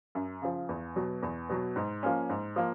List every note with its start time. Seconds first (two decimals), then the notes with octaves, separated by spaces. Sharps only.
0.15 F#2
0.42 C#3 F3
0.69 E2
0.96 B2 F#3
1.22 E2
1.49 B2 F#3
1.76 G#2
2.03 F3 A#3 C#4
2.29 G#2
2.56 F3 A#3